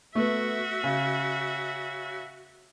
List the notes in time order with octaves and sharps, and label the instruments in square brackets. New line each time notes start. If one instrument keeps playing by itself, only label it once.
[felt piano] A3 B3 [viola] F#4 E5
[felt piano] C#3